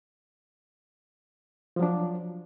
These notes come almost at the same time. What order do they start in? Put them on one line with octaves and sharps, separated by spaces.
F3 F#3 D4